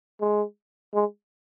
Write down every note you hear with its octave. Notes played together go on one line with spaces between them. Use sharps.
G#3
G#3